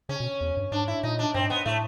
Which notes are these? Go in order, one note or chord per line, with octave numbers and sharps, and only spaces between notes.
C#3 C#4
B2
E2
G2
G#2 D4
E4
A#2 D#4
D4
G2 C4
G#2
B3
A2 A3